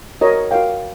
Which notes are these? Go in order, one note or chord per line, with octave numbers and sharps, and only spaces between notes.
F#4 A#4 C#5 D#5
F#4 A#4 C#5 F5 G5